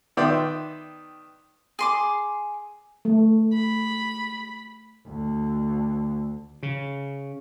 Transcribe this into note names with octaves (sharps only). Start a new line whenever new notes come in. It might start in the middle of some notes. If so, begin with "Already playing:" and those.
D#3 B3 D5 E5 G5 C6
G#4 C6 D6
A3
B5
D2
C#3